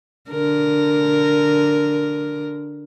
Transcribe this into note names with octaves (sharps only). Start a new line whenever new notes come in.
D3 A#4